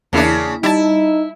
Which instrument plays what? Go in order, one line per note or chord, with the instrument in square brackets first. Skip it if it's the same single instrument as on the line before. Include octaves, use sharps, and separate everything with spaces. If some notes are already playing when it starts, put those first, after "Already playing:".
[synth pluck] E2 A#3 E4 [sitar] C#3 D4
[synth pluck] G3 A5 [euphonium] D#4 [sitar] E4